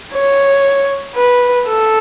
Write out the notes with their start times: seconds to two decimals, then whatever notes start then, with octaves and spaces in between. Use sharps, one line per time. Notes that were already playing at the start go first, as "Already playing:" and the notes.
0.14 C#5
1.15 B4
1.67 A4